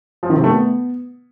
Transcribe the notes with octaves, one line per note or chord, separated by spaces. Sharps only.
F3
D#3
C3
A3
B3